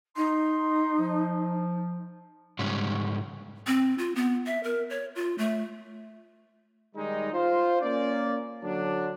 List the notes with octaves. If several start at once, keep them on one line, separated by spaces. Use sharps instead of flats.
D#4 C6
F3
G#2 C#3 G3 C#4
C4
F4
B3
E5
A#4
C#5
F4
A3
D#3 G3 G#3 D#4
F4 C5
A#3 C#4 D5
D3 F#3 D4